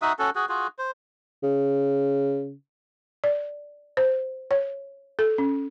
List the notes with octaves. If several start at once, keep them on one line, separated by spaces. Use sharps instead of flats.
D#4 F#4 E5 D#6
C#4 F#4 A4
F#4 G#4
F4 F#4 G#4
C5
C#3
D5
C5
C#5
A4
C#4